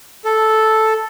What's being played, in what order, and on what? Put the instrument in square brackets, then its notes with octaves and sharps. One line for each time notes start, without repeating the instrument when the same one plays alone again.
[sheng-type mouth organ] A4